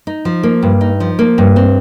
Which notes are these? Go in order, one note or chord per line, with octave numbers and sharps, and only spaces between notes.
D#4
F3
A#3
G2
D#4
F3
A#3
G2
C4